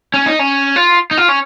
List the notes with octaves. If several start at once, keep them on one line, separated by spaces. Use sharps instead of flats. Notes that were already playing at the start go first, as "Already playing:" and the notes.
C#4
D#4
C#4
F4
D#4
F4
C#4